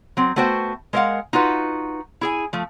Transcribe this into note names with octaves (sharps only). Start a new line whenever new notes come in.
F#3 C4
A3 B3 F#4 C5 G5
G#3 A#4 C5 D5 F5 F#5
D#4 F4 F#4 B4
E4 G#4 G#5
F3 A3